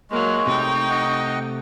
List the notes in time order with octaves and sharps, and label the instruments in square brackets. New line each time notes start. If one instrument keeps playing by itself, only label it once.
[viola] F#3 A#3 [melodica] G#3 [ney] C#6
[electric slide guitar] C3 A3 [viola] D#4 G5
[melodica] D#5 F#5